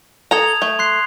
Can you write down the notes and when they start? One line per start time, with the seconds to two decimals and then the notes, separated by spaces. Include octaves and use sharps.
0.31 A4 A#5 D#6 G#6 F7
0.62 A3
0.79 C6 F#6 C7